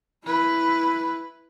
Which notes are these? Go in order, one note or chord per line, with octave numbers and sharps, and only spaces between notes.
E4 B4